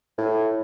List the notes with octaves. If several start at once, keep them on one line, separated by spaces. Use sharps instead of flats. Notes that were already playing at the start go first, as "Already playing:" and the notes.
A2